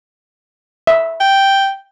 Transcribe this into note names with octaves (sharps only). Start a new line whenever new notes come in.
E5
G5